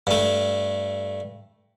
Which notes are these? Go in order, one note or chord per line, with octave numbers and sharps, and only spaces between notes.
G2 A3